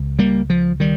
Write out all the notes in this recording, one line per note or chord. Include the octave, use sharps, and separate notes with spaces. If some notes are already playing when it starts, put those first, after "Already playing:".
Already playing: C#2
G3 A#3
F3
D#3 G3